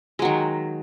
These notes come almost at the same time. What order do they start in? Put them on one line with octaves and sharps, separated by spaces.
G#3 F#3 D#3